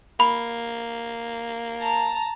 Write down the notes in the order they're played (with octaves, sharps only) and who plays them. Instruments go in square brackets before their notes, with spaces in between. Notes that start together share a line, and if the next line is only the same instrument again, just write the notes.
[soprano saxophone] A#3 [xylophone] B5
[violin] A5 A#5